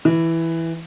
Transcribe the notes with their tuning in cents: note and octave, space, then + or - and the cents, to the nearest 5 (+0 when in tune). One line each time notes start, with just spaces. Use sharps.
E3 +0